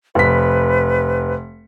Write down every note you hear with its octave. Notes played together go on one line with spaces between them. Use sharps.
F1 B4 B6